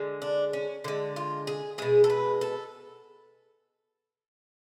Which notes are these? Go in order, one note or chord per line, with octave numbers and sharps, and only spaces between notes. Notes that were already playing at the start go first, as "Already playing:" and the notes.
Already playing: D3 G#3
D4
C#4
D3 G#3
F4
G#4
B2 G#3 G#4
A4
B4
A4